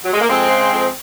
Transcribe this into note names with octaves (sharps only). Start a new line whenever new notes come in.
F#3
G#3
A#3
F2 G#3 C4
C#3
F2